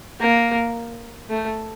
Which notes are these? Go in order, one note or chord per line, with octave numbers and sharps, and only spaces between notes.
A#3
A3